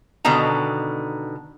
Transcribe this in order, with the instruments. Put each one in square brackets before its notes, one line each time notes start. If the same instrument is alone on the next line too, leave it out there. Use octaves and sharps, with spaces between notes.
[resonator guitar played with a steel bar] B2 D3 D#3 A#5